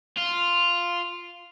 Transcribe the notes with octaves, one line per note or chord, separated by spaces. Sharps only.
F4